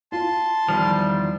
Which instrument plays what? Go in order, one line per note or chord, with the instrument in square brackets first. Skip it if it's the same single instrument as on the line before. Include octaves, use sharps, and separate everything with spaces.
[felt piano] F4 [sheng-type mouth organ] A5 C6
[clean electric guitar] E2 D#3 F3 [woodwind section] G3